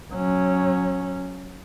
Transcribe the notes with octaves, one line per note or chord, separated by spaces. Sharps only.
F#3 C#4